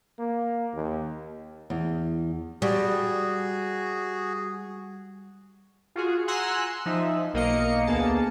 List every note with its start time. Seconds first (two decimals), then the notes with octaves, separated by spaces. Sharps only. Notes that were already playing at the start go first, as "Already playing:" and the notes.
0.19 A#3
0.74 D#2
1.70 E2
2.62 G3 F#4 G#4
5.95 F4 F#4 G#4
6.27 F#5 G#5 A#5 C6 E6 F#6
6.86 F3 D#4 E5
7.34 B1 A#3 A#4 D#5 F5 C#7
7.87 D2 A#3 B3 G#4 A5